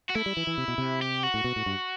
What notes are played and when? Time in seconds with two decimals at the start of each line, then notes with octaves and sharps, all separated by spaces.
0.09 F#4
0.15 A3 E4
0.26 G3
0.37 E3
0.47 E3
0.58 C3
0.68 B2
0.78 C3
1.02 G4
1.23 F#4
1.34 A2
1.44 B2
1.56 A2
1.66 G2